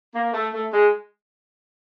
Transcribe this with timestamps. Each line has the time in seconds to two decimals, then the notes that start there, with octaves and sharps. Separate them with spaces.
0.15 A#3
0.33 A3
0.53 A3
0.73 G#3